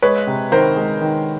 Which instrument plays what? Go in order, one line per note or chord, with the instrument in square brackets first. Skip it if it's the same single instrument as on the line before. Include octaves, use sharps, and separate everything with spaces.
[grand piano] G#3 B4 C#5
C3
D#3 A#4 C5
G#3
D#3